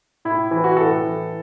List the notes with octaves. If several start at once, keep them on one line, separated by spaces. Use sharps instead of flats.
A2 E4
E3 E4
F#4
A2 A4
E3